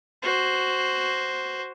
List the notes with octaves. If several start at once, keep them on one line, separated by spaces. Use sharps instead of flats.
F#4 C5